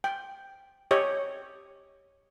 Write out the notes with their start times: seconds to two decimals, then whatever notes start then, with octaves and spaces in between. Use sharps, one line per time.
0.04 G5
0.91 G4 C#5 D#5